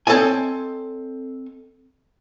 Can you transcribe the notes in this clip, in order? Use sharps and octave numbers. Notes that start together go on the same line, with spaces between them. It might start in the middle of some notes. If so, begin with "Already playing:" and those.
C4 A4 C#5 D#5 G#5